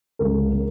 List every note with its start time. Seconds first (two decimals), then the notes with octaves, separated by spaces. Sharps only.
0.19 C#2 C#3 G#3 A#4
0.53 C#3